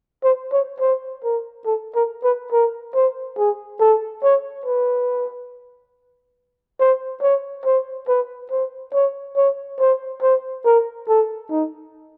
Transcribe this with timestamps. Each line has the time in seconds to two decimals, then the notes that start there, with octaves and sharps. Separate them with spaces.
0.24 C5
0.52 C#5
0.80 C5
1.24 A#4
1.66 A4
1.95 A#4
2.23 B4
2.52 A#4
2.95 C5
3.38 G#4
3.80 A4
4.23 C#5
4.66 B4
6.80 C5
7.22 C#5
7.65 C5
8.08 B4
8.51 C5
8.94 C#5
9.37 C#5
9.79 C5
10.22 C5
10.65 A#4
11.08 A4
11.50 D#4